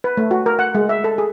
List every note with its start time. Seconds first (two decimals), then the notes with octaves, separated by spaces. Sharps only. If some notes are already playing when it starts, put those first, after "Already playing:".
0.04 B4
0.17 A3
0.31 F#4
0.46 A#4
0.59 F#5
0.75 G#3
0.89 E5
1.04 A4
1.18 G#4